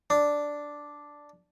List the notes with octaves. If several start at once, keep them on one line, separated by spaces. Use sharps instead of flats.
D4